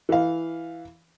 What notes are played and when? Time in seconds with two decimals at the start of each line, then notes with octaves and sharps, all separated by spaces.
0.09 E3 F5